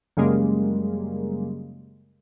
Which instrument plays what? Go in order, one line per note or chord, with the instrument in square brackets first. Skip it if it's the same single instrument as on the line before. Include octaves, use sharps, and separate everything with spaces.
[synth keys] F#2 C#3 G3 G#3 A#3